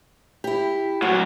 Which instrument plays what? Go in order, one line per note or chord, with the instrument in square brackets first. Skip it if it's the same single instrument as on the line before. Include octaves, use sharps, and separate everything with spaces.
[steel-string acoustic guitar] E4 G4
[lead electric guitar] A2 F#3 [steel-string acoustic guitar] F#5